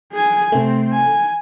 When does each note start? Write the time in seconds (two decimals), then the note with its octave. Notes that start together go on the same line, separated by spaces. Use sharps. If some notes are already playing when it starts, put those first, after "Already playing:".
0.13 G#4 G#5
0.52 C3 A3 C4
0.93 G#5